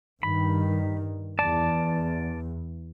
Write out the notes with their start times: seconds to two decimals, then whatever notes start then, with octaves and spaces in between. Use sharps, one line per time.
0.23 G2 D#3 B5
1.39 E2 D5 A5